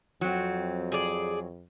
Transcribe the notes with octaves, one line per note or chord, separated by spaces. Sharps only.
F2 F#3 C4
G#4 D5